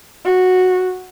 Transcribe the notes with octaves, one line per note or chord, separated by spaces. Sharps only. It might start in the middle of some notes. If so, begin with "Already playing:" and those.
F#4